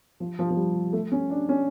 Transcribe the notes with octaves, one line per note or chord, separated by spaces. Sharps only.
F3
F3
F3
G3
A3
C#4
D4
C#4